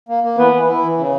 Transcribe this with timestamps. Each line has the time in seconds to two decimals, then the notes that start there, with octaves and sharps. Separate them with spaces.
0.09 A#3
0.24 A#3
0.38 E3 B3
0.53 E3
0.68 E4
0.83 E3
0.97 C#3